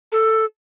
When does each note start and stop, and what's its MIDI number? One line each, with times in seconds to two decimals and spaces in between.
0.12 0.45 69